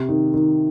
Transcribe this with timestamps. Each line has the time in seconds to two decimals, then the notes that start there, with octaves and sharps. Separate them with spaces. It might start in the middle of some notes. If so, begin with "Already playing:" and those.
Already playing: C3
0.08 D#3
0.34 D#3